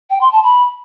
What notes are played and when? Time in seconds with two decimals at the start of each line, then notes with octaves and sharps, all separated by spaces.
0.10 G5
0.21 C6
0.32 A5
0.43 B5